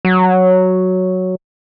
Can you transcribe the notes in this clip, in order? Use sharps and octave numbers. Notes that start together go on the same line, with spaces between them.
F#3